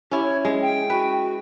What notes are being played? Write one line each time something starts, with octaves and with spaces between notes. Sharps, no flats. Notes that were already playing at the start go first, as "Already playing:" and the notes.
C#4 E4 G4
C#5
G#3 C#4
G5
F#4 B4